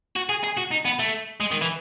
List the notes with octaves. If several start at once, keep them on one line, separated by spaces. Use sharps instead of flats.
F#4
G#4
G#4
F#4
D#4
B3
A3
G#3
D#3
E3